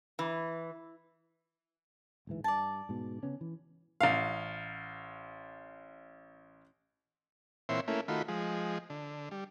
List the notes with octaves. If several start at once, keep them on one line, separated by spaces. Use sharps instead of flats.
E3
D1 G#2 E3
G2 D5 A5
G#2 B2
C#3 B3 C#4
E3
A1 F5
A#2 E3 C4 C#5 E5 C6
A3 A#3 C#4 E4
D#3 A3 F4 F#4 B5
F3 G#3
D3
G3